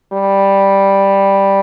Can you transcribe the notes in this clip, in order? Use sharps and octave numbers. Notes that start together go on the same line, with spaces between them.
G3